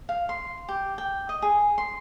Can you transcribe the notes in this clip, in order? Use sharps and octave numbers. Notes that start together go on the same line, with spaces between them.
F5
C6
G4
G5
D#5
G#4
C6